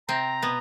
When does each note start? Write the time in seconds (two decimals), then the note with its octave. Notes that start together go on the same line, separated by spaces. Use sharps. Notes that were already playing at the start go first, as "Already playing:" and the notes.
0.08 C3 C4 A#5
0.42 B2 B3